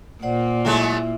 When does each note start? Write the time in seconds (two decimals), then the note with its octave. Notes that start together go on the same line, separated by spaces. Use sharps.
0.23 A#2 A#3 C5 D5 F#5
0.65 F#3 G#3 A3 E4 E5